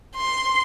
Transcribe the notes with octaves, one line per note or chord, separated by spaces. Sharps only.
C6